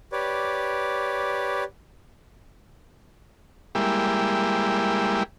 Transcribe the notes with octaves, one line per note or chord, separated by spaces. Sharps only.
G4 B4 C#5 D5
G3 G#3 A#3 E4 G4